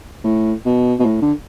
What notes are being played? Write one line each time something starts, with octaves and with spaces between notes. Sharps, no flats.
A2
B2
B2
A2
D3